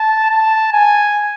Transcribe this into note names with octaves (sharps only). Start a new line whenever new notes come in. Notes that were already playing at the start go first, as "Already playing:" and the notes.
Already playing: A5
A5
G#5